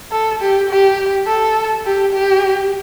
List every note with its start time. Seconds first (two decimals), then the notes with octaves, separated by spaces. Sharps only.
0.12 A4
0.41 G4
0.69 G4
1.27 A4
1.85 G4
2.13 G4